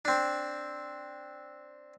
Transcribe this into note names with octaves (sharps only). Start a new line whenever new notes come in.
C4 D4